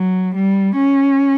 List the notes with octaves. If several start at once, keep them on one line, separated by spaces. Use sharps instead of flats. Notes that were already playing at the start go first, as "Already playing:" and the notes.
Already playing: F#3
G3
C#4